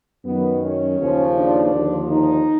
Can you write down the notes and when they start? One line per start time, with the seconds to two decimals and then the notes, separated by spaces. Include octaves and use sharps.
0.25 F#2 D#3 F#3 B3
0.63 C#4
1.00 D#2 C#3 F3
1.37 D4
1.74 D#2 D3 F3
2.10 D#4